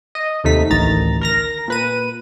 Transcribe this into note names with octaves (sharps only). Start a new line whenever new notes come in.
D#5
D#2 C3 A3 D#4 B6
A1 D2 D#3 A#5 A6
A#4 A#5 A#6
A#2 B4 D#7